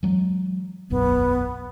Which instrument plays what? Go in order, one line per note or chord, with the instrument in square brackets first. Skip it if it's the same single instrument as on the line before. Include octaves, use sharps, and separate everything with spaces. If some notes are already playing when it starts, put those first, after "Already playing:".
[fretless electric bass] E3 F#3 G#3
[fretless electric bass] E1 B1 F#2 [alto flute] B3